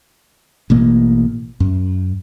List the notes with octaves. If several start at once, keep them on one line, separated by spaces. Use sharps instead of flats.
A1 B2 A#3
F#2